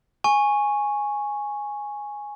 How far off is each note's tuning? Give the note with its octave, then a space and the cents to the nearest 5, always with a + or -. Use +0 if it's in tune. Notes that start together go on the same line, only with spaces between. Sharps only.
G#5 +0 C#6 -5